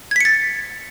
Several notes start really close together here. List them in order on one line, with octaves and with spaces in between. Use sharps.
G#6 B6 C#7 A6